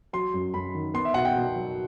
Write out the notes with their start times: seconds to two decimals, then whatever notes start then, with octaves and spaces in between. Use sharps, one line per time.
0.13 F#3 C6
0.34 F#2
0.54 F#2 B5
0.75 D#3
0.94 B3 C6
1.05 E5
1.14 B2 F#5
1.25 G5
1.36 B2
1.55 F#3